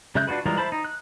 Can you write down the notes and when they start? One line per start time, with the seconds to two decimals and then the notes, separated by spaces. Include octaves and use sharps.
0.15 C#3 G#3 E5 F#6 G6
0.27 D4 F4 F#4 B4
0.46 E3 G3 G#3 F4 A#4
0.57 E4 C5 A5 B5
0.72 D#4
0.85 F#6